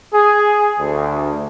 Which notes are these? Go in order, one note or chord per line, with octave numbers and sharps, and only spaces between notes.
G#4
D2